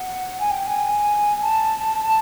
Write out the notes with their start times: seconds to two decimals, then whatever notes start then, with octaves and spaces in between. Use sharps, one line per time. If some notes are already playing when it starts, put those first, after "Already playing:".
Already playing: F#5
0.40 G#5
0.51 G5
0.66 G#5
1.41 A5
2.01 A5